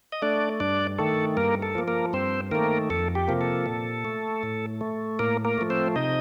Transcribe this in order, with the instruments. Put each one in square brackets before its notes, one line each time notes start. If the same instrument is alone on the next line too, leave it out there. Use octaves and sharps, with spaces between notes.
[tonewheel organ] D#5
A3 D4 D5
G2 D4 D5
D#3 A3 A4
G2 A#3 A#4
A4
F3 A#3
A#3 A#4
G2 C4 C5
D#3 A3 A#3 A#4
F2 A4
G4
C3 F3 A#3
A4
A#2
A3
A2
A3
A2 A#3 A#4
A#3 A#4
F3 A3
C4 C5
C3 D#4 D#5